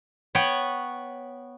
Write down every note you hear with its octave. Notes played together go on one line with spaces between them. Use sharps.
B3 B4 C#5 G5